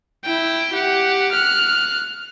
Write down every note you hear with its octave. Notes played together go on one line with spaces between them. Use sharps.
E4 G5
G4 F#5
F6 F#6